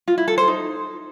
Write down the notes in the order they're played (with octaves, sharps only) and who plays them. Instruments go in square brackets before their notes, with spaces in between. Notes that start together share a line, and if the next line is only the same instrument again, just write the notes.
[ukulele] F4
E4
A4
C5
D#4